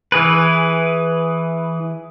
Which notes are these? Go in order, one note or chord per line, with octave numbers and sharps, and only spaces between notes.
E3 G#4 B4